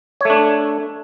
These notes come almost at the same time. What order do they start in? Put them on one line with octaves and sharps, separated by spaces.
C#5 A3 D4